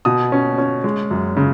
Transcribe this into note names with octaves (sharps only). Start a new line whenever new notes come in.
B2 D#6
C#4
C#4
G#3
F#2
C#3